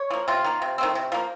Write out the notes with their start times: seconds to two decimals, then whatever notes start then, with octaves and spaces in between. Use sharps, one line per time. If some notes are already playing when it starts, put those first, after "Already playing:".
Already playing: C#5
0.11 F3 A#3
0.28 C3 F4
0.44 D#3 A#3
0.62 C3
0.78 D#3 A3 C4
0.95 C3
1.12 F3 A#3